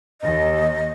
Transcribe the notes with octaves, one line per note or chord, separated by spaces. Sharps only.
D#2 D#5